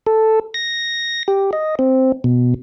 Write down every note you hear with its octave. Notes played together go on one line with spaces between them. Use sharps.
A4
A#6
G4
D#5
C4
B2